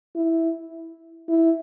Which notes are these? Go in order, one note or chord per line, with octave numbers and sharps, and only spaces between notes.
E4
E4